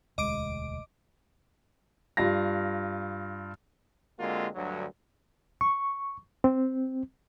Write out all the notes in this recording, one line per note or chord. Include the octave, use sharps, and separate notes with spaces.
E1 D2 G#3 D#5 D6 D7
G2 F4 F5 A#6
D3 G#3 A#3 C4 F4 F#4
D2 G2 D3 F#3
C#6
C4